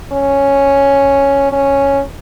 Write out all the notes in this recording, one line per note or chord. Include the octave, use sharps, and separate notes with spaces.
C#4
C#4